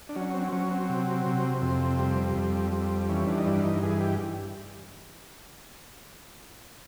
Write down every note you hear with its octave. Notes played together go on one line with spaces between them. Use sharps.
D4
F#3 C#4
C4
F#3 C#4
C4
C3
C3
F2 C4
G3
F2
G3
E3 C#4
D4
D#4
G2 D4
D#4
E3 G#4
G4